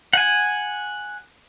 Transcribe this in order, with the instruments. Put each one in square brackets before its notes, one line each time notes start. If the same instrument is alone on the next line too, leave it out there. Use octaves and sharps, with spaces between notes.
[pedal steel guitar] F#5 G#5